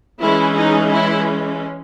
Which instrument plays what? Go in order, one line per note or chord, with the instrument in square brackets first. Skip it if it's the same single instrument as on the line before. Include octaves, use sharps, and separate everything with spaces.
[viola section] E3 G#3 C#4 E4
D#4
E4